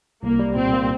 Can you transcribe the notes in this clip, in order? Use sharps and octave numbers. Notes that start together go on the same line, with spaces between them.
C2 A#3
G3
A#2 C4
A#3